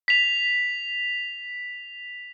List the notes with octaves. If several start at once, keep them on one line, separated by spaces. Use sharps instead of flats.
B6 F7